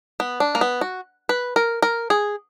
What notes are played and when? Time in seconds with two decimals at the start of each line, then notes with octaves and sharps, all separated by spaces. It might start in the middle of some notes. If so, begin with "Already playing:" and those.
0.20 B3
0.40 D4
0.55 A#3
0.61 B3
0.81 F#4
1.29 B4
1.56 A#4
1.82 A#4
2.10 G#4